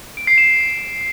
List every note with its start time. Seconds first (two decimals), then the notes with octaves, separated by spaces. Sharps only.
0.17 D7
0.27 C7
0.38 E7